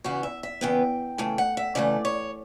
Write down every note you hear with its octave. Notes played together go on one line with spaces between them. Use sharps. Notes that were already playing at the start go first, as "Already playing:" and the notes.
E2 C#3 E3 B3 F#4
E5
E5
E2 C#3 E3 B3 G5
C#3 E3 A3 G5
F#5
E5
C#3 E3 A3 D5
C#5